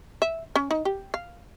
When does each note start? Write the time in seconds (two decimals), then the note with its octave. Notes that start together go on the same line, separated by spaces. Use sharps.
0.22 E5
0.56 C#4
0.71 D#4
0.85 G4
1.14 F5